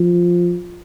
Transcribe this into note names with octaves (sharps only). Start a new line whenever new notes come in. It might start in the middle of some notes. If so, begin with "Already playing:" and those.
Already playing: F3